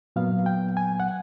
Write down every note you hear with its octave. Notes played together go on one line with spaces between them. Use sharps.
A#2 F#3 B3 F5
G5
G#5
F#5